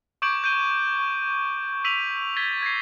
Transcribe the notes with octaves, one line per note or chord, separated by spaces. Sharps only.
C#6 D6 G6 G#6 D7 F#7
G6 D7 D#7 G7
C#6
E6 B6 D#7 F7 F#7
G#6 A6 B6 F7 G7
G#6 A#6 C7